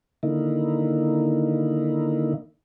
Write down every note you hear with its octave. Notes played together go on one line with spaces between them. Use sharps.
D3 D#3 A#3 D#4 E4